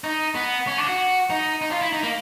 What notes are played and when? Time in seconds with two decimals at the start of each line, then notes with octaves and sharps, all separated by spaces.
0.04 D#4
0.35 B3
0.67 C#4
0.78 D4
0.88 F#4
1.30 D#4
1.62 D#4
1.72 F4
1.81 E4
1.93 D#4
2.03 A#3